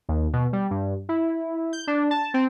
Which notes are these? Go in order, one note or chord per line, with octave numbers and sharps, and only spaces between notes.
D#2
B2
G3
G2
E4
G6
D4
A5
C4